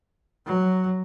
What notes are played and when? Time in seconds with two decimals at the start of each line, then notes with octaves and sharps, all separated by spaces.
0.46 F#3